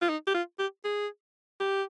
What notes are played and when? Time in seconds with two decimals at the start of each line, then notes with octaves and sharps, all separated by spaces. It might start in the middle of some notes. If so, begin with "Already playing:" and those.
0.02 F4
0.09 D#4
0.27 G4
0.34 F4
0.59 G4
0.84 G#4
1.60 G4